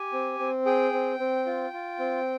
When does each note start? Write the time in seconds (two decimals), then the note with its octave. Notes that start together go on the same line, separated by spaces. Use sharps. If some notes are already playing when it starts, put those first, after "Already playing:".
Already playing: G4 G#5
0.13 C4
0.39 C4
0.66 G#4 G5
0.93 C4
1.19 C4
1.46 F4
1.73 F4
1.99 C4